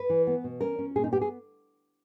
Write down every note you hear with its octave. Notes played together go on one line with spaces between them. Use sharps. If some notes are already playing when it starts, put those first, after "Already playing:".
Already playing: B4
E3
B3
B2
C#4 A#4
C#4
A#2 G#4
D#4
B3 G4
G#4